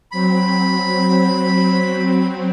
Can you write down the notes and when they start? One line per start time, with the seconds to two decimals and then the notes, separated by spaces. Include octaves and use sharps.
0.12 F#3 C4 B5